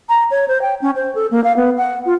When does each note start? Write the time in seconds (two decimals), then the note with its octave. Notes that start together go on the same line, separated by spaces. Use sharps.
0.09 A#5
0.31 C#5
0.48 C5
0.62 G5
0.82 C#4
0.96 C5
1.15 A4
1.31 A#3
1.44 F5
1.57 B3
1.78 F#5
2.06 F4